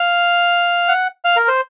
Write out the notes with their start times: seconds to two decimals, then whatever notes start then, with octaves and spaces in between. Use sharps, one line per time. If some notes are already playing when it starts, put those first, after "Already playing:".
Already playing: F5
0.88 F#5
1.25 F5
1.36 A#4
1.48 C5